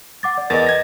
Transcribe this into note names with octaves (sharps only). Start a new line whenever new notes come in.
F#5 D6 A6
D5
E2 A#4 B4 D#5 A6
G#6 A#6